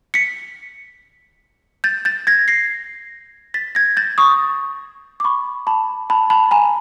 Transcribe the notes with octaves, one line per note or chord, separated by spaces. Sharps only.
B6 C#7
G6 A6
G6 A6
G#6 A#6
A#6 C7
A6 B6
G#6 A#6
G6 A6
C#6 D#6
D6
B5 C#6
A5 B5
A5 B5
A5 B5
G#5 A#5